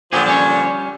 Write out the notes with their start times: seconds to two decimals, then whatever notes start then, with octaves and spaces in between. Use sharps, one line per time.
0.12 A#2 D3 F3 F#3 G4 G#4
0.26 G3 C#4 C#5